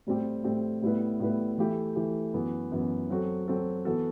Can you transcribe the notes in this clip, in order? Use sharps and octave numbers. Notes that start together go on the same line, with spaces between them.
A2 G3 C4 G4
A2 G3 C4 G4
A2 G3 B3 E4 B4
A2 G3 B3 E4 B4
E3 A3 E4 G4
E3 A3 E4 G4
F#2 E3 B3
F#2 E3 B3
F#3 C4 F#4 A4
F#3 C4 F#4 A4
E3 B3 F#4 A4